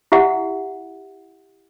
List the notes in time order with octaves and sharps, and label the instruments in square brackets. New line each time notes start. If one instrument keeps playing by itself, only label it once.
[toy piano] E4 G4 E5 F#5